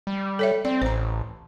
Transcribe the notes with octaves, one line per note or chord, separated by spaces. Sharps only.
G3
A4 C#5 E5
C4 D5
A1 C5 A#5